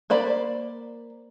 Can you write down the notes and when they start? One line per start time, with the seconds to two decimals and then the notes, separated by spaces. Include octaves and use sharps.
0.10 A#3 C5 D5 B5